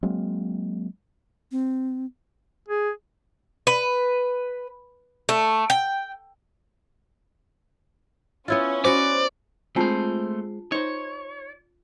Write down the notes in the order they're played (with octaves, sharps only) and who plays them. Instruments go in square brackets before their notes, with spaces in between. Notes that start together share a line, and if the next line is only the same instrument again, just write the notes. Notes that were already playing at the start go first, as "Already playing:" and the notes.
[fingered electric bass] F#3 G#3 A#3 C4
[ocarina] C4
[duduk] G#4
[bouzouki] B4
A3
G5
[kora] B3 E4 F4 [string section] C#4
[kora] B3 F#4 B4 [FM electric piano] C5 [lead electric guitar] D5
[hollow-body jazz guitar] G#3 C4 [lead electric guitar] A3 C5 [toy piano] D4 F4 A5
[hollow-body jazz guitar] D#4 C5 [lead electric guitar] C#5